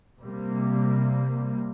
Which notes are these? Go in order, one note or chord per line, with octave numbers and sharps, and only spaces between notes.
C3 G3 A#3